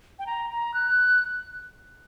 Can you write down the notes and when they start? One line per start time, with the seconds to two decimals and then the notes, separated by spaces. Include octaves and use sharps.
0.19 G5
0.27 A#5
0.50 A#5
0.74 F#6